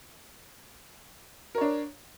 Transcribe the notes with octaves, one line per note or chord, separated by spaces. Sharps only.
D4 A#4 C#5